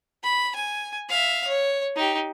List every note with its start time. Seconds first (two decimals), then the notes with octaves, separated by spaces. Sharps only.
0.23 B5
0.55 G#5
1.09 E5 F5
1.47 C#5
1.96 D#4 G4